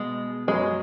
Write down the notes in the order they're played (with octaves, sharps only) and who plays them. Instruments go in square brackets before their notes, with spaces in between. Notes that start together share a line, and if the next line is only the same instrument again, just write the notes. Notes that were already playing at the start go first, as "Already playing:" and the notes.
Already playing: [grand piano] B2 B3 G#4 [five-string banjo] G#3
[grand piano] F#2 F#3 C#4 B4 [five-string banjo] G#3